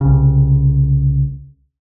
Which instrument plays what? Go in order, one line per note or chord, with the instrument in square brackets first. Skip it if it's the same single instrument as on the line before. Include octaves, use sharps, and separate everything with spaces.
[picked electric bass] C2 C#3